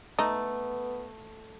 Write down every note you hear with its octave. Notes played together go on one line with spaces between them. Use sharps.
A3 B3 D#4